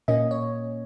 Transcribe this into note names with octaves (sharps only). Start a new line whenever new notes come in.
A#2 A#3 C#4 D#5
C#5